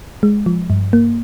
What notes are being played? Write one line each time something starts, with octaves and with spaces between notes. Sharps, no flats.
G#3
F3
G2
A#3